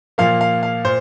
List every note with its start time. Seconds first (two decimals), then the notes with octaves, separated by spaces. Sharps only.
0.18 A#2 F3 A#3 F5
0.41 F5
0.63 F5
0.85 A#2 C5